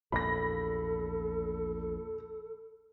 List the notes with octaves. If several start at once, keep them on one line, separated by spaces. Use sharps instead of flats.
A#1 E2 A#2 A4 B5 A#6